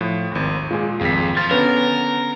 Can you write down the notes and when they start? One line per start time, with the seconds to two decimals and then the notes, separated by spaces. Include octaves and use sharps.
0.01 A2 F3
0.32 G#1 D#2
0.71 A#2 G#3 F4 G#4
1.01 G#1 F2 B6
1.37 F3 C6 A6
1.51 D3 B3 C#4 A#4 B4